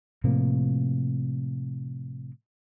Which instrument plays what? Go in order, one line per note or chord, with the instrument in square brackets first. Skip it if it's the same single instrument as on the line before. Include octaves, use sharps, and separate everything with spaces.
[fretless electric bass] A2 C3 F3 A#3